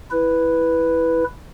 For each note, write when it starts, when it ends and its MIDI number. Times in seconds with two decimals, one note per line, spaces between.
0.11 1.24 64
0.11 1.24 71